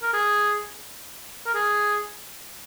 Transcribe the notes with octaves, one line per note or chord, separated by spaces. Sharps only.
A#4
G#4
A#4
G#4